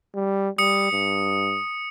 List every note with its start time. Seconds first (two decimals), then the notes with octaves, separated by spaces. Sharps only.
0.15 G3
0.58 G3 D#6 C#7
0.92 G2